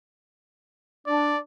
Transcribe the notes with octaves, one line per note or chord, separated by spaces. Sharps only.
D4 D5